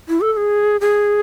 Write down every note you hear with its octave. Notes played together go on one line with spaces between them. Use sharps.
E4
A4
A4
G#4
G#4